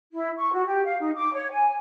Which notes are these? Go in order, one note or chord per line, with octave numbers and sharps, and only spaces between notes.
E4
C#6
F#4
G4
F5
D#4
D6
C#5
G#5